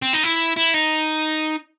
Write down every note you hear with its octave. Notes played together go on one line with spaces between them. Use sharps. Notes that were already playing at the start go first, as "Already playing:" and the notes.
C4
D#4
E4
E4
D#4